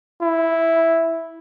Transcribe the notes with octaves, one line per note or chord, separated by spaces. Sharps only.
E4